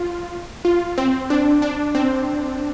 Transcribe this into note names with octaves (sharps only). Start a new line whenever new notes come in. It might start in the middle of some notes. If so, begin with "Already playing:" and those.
Already playing: F4
F4
C4
D4
D4
C4